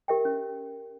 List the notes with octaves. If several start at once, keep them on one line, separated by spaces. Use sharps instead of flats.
G4 A#4 E5 G5
C#4